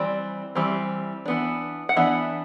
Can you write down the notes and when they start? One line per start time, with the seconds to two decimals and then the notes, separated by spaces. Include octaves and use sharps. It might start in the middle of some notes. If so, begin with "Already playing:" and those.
Already playing: E3 G3 C4 D5
0.55 E3 G3 C4
1.26 E3 B3 D4
1.89 F#5
1.96 E3 B3 D4 E5